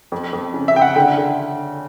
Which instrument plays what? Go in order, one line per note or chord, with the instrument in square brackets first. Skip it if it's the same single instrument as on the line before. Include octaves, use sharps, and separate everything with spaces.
[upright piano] F2
F2
C#3
[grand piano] E5
[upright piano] C#3 [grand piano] G5
[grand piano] F#5
[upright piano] D3 [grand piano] G5
[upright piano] D3